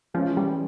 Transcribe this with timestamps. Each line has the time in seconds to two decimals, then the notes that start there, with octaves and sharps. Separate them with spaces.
0.14 E3 F3 G#3 C#4
0.37 G3